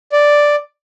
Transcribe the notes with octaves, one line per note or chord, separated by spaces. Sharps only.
D5